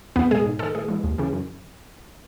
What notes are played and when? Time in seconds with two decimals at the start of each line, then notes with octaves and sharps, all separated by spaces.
0.16 E2 B3
0.31 B2 G#3 G#4
0.45 G#2
0.59 D#3 G#3 A4
0.75 A2 G#4
0.88 E3 G#3
1.04 D#2
1.18 C#3 E3
1.33 F#2